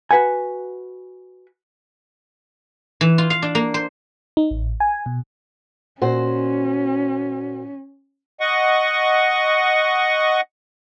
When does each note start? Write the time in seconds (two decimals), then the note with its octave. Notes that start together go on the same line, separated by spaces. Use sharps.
0.11 F#4 B4 F#5 G#5
3.01 E3
3.18 F4
3.30 F5
3.42 D4
3.55 A#3
3.74 C5
4.37 D#4
4.51 A1
4.80 G#5
5.06 B2
6.01 A#2 C#4 F#4 C5
8.40 D#5 F#5 C#6